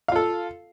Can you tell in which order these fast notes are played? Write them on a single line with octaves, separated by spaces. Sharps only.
F5 F4 A4